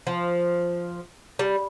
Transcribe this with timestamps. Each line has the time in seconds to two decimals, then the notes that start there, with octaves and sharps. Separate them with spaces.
0.07 F3
1.39 G3